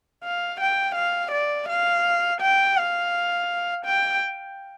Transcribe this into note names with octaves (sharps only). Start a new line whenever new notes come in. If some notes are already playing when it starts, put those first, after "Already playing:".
F5
G5
F5
D5
F5
G5
F5
G5